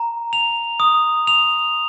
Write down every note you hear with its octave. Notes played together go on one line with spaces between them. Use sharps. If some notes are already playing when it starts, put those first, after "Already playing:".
Already playing: A#5
F7
D#6
F7